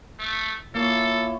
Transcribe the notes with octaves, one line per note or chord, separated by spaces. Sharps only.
A3
A#3 E4 F4 A4 C#5